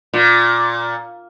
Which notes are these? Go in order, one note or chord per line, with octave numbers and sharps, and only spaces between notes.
A#2